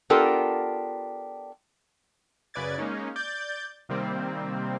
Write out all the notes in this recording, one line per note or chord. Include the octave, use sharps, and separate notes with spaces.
B3 D4 F4 G4 A4 A#4
F#2 C#3 B4 D5 G#6 A6
G#3 A#3 C#4 D#4
D5 G6 A6
C3 D#3 G3 A#3 C4